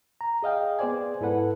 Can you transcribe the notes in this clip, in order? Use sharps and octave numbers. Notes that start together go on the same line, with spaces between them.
A#5
G#4 D#5 F5 G5
B3 G#4 C5 D5 G#5
G#2 E4 A4 B4 F#5